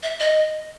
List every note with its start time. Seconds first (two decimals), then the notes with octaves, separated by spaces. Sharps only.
0.03 E5
0.20 D#5